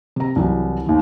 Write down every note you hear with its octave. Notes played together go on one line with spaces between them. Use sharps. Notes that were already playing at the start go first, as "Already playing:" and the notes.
C3 A#5
C2 E3 F#3
D#2 D#3